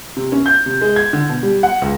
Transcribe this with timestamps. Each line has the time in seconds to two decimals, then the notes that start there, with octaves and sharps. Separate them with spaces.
0.17 C3
0.32 C#4
0.46 G6
0.66 C3
0.81 G#3
0.96 G#6
1.13 D3
1.29 B2
1.43 G3
1.63 F#5
1.82 C#2